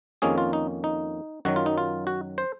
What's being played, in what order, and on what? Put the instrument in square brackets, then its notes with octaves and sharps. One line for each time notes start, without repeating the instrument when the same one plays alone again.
[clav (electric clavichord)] F2 D#3 A#3 C#4 G#4
F4
D#4
D#4
F#2 D#3 F#3 F#4
F4
D#4
F4
F#4
C5